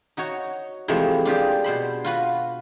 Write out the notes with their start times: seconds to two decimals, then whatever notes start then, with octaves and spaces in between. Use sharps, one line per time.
0.17 D#4 F#4 C#5
0.88 C3 E3 F3 G#3 A3
1.25 D4 F4 G4 G#4
1.64 B2 C5 B5
2.04 F4 F#4 B4